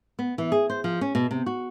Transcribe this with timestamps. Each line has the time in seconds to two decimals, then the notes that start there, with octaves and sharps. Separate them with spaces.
0.19 B3
0.38 E3
0.52 G#4
0.70 C5
0.84 F3
1.01 C#4
1.15 B2
1.31 C3
1.46 F#4